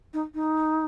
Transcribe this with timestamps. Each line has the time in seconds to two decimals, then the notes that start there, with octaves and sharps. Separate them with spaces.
0.13 D#4
0.34 D#4